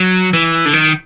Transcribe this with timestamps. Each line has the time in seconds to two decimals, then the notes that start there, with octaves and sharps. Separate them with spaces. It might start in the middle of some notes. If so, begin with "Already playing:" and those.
Already playing: F#3
0.33 E3
0.66 D3
0.73 D#3